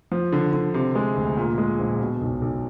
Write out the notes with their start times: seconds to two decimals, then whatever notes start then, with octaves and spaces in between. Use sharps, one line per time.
0.12 F3
0.32 D3
0.53 D3
0.74 C3
0.95 G#3
1.16 D2
1.37 A#2
1.58 G#3
1.79 A#1
2.00 B2
2.21 B1
2.42 B1